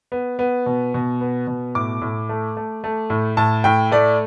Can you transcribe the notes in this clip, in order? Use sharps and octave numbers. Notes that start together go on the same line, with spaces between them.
B3
B3
B2
B2
B3
B2
A2 D6
A2
A3
A3
A3
A2
A2 A5
A2 G5
A3 D5